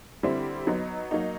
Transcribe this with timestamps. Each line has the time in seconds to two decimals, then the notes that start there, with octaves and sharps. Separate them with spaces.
0.23 D3 G3 C4 E4
0.67 F#3 B3 D#4
1.11 F#3 A#3 D#4